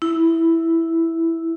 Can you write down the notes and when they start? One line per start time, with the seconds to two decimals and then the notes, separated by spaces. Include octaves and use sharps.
0.02 E4